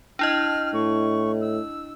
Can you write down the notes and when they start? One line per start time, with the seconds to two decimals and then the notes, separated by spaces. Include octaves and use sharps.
0.19 D4 E4 D#5 F6
0.73 A2 C#6
1.40 E6